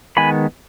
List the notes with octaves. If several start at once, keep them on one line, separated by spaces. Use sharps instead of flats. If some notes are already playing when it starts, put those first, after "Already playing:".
D#3 G#3 B3 G#5 B5